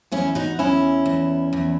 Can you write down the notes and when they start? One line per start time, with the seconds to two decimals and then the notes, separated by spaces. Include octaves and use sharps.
0.12 E2 C#4 E4
0.35 D#4 F#4
0.59 E2 C#4 E4
1.06 E2
1.53 E2